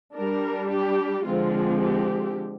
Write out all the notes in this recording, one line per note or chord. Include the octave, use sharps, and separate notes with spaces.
G3 D4 A#4
G4
D3 F3 G#3 C4 F4
G4